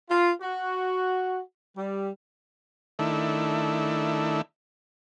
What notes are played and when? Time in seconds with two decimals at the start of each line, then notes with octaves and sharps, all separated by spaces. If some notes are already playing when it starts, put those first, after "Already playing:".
0.10 F4
0.42 F#4
1.77 G3
2.99 D#3 A3 D4 E4